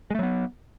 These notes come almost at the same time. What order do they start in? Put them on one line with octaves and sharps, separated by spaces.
G#3 A3 F#3 B3